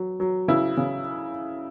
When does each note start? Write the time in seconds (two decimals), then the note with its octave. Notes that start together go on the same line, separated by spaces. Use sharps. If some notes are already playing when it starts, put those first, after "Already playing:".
Already playing: F#3
0.20 F#3
0.48 C#3 E4
0.77 C#3